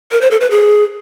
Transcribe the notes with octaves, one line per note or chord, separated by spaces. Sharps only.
A#4
C5
A4
B4
G#4